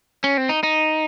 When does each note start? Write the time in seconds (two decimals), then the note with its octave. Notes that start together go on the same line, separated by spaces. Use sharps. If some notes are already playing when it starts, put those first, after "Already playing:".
0.24 C#4
0.37 C4
0.49 D#4
0.63 D#4